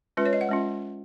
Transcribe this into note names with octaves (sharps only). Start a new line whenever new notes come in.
G#3 C#4 F4 B4
C#5
D#5
F#5
G#3 C#4 F4